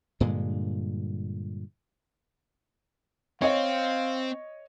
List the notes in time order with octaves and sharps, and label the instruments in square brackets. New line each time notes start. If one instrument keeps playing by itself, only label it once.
[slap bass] G2 A#2 D3 G#3
[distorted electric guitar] C4 [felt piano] C#5 D#5 [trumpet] F5